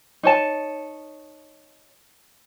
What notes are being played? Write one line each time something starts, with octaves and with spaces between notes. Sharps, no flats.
D#4 C#5 A5